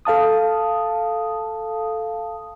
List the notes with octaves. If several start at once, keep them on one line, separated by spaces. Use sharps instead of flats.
A4 F5 A5 D#6